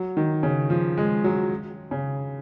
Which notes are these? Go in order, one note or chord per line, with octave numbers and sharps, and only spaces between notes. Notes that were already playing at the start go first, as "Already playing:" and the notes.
Already playing: F#3
D#3
C#3
F3
G#3
F#3
C#3